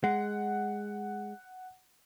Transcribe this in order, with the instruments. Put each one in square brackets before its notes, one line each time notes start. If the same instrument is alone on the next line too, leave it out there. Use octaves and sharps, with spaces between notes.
[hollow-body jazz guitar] G#3 [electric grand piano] F#5